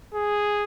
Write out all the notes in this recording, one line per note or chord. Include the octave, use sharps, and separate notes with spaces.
G#4